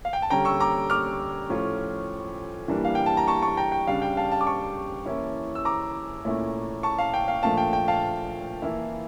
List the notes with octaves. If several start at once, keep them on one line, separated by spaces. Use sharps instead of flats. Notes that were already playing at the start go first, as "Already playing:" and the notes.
F5
G5
A5
D3 G3 C#4 G5 A#5
C#6 E6
A#5 D6
D6 F6
A2 F3 C#4 F4
E3 G3 A#3 D4
F5
G5
A5
A#5
A5 C#6
A5 C#6
G5 A#5
G5
C#3 G3 D4 F5
G5
F5 A5
F5 A5
D6
A5 C#6
E3 A#3 C#4 E4
E6
A#5 D6
A#2 A3 C#4 E4
A5 C#6
F5 A5
G5
F5
A#2 F3 A3 D4 F5 A5
G5
G5
F5 A5
E3 A#3 E4